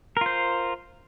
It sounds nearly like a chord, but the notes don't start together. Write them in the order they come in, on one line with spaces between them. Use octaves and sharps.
A#4 F4 C5